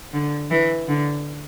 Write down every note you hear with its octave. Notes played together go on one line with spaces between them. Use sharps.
D3
E3
D3